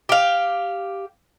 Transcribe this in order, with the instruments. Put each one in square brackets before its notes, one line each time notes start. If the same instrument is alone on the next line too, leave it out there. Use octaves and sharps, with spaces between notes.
[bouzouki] G4 F5